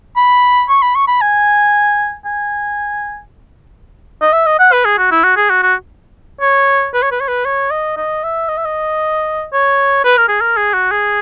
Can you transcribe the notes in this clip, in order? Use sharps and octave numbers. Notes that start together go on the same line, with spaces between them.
B5
C#6
B5
C#6
B5
G#5
G#5
D#5
E5
D#5
F#5
B4
G#4
F#4
E4
F#4
G#4
F#4
F#4
C#5
B4
C#5
B4
C#5
B4
C#5
D#5
D#5
E5
D#5
E5
D#5
C#5
B4
A#4
G#4
A#4
G#4
F#4
G#4